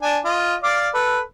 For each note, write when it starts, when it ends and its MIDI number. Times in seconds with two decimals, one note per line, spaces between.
0.02 0.18 62
0.02 0.18 80
0.25 0.55 65
0.25 0.55 75
0.63 0.89 74
0.63 0.89 77
0.63 0.89 86
0.94 1.20 69
0.94 1.20 71